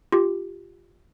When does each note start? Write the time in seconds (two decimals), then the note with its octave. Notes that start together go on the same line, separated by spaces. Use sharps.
0.12 F4 G4